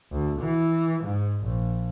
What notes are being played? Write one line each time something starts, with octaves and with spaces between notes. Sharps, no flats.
D2
E3
G#2
A#1